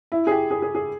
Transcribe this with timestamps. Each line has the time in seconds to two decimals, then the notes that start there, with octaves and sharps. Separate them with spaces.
0.12 E4
0.27 G#4
0.31 G4
0.51 G#4
0.62 G#4
0.75 G#4